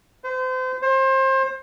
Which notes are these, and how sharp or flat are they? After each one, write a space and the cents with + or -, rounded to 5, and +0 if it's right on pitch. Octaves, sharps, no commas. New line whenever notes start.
C5 -35
C5 +30